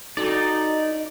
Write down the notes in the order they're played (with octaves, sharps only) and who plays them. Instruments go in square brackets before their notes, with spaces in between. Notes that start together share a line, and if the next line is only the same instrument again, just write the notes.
[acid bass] D#4 [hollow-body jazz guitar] F#4 A4 [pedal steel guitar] D5